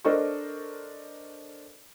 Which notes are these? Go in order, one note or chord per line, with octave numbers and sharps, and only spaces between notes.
D4 A4 A#4 C5 D#5 C#6